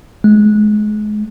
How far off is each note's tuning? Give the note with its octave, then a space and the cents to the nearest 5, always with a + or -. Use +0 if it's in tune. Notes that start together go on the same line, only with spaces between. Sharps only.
G#3 +30